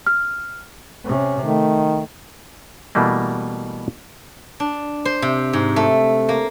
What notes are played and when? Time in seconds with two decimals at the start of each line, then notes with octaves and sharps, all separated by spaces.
0.07 F6
1.04 C3 C#4
1.45 D#3 A3
2.95 B2 E3 G3 A3 A#3
4.60 D4
5.05 C5
5.22 C3
5.53 G#2
5.76 A3
6.29 A#3